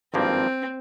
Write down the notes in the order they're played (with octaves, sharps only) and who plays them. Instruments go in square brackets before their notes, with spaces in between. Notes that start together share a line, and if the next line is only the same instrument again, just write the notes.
[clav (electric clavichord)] G#1 G2 F3 A#3 [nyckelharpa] C4